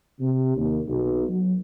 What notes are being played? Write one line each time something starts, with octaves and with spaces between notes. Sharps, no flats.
C3
D#2
B1
F#3